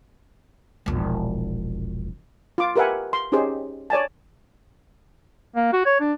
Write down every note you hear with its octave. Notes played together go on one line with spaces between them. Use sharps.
E1 A#1
F4 D6
G4 A#4 B4 E5 F#5 G#5
C6
C#4 D#4 G4 G#4 C5
C#5 D5 G#5 A5
A#3
F#4
C#5
D4